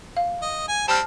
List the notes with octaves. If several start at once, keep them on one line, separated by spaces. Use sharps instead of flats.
F5
D#5
G#5
G3 C4 A5 F6